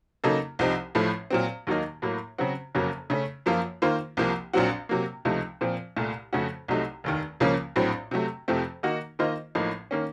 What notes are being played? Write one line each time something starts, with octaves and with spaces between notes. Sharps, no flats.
C#3 F#3 A#3 D#4 A4
C2 C3 F3 C4 D#4
A1 A2 F3 A3
A#2 F#3 C4
D#2 D#3 F#3 A#3 D#4
A2 F#3 A#3
C#3 F#3 C4 F#4
F#1 F2 C#3 F#3 A#3
C#3 A3 C#4
F#2 F3 A#3 F4
D#3 A#3 F4 C5
C2 C3 F3 A#3
A#1 A#2 F#3 C4 F#4
C3 F#3 A#3
C#2 C3 F3 A3 D#4
A#2 F3 C4
C2 A#2 A3
F2 C#3 A3 C#4 F#4
C2 C3 F#3 A3 D#4
F1 D#2 D#3
C#2 C#3 F3 A#3 C#4
A#1 A2 F#3 C4
C3 F#3 A3
F2 C3 F3 A3 C4
D#3 A#3 D#4 F#4
D#3 A#3 F4 C5 D#5
A1 A2 F3 A#3 D#4
D#3 A#3 C#4